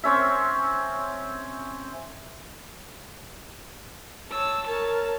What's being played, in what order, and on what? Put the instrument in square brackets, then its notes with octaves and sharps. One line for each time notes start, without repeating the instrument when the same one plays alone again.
[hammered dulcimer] C4 C#4 E5
[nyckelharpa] C#5 A5 [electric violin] E6
[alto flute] A#4 [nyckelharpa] C#5 [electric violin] A5